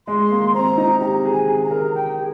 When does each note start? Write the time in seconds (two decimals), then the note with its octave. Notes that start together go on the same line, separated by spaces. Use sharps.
0.07 G#3 C6
0.31 A#3
0.54 C4 A#5
0.77 D#4
1.01 G4 A#5
1.25 G#4
1.32 G#5
1.48 G#4
1.64 A#5
1.71 A#4
1.95 G5
2.18 G#4